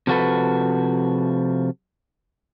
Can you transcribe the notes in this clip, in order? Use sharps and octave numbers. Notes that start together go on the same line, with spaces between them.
C3 F3 F#4 A4 B4